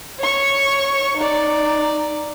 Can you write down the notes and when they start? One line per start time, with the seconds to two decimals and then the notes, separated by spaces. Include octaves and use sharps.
0.19 C#5 C#6
1.17 D#4 D5